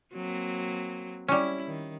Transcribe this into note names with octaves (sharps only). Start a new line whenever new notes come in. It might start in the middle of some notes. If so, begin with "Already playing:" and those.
F#3 A#3 C4
G3 C#4 E4
D#3